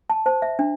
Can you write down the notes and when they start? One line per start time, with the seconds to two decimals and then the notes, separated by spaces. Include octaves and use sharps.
0.10 A5
0.26 C5 A5
0.42 E5
0.59 D4